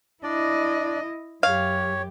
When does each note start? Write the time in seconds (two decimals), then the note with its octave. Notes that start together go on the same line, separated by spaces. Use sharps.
0.23 D4 E4 D5 D#5
1.43 F#2 G4 C#5 F5